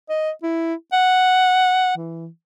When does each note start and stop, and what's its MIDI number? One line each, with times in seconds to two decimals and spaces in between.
0.09 0.30 75
0.43 0.74 64
0.93 1.95 78
1.97 2.28 52